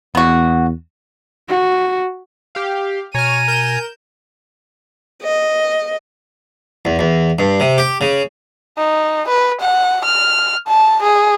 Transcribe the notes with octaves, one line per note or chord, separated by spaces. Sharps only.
E2 B3 F#4
F#4
G4 F5
B2 C#5 G#5 A#5 F6 D#7
A#4 G6 E7
D#5
E2
E2
G2
C3
G4
C#3
D#4
B4
F#5
F6
A5
G#4